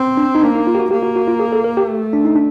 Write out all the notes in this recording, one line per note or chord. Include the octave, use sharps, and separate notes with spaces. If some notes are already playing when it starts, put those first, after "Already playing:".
Already playing: C4
D4
D#4
A#3 D4
D#4
F4
G4
F#4
A#3 G4
F#4
F#4
F4
G#4
A4
A#4
G4
A3
D4
D#4
D4